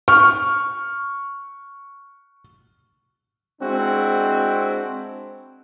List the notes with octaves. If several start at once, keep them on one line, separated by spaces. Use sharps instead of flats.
C#6 F6
G#3 C4 D4 E4 F#4